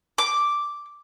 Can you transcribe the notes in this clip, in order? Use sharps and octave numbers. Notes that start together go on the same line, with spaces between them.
D6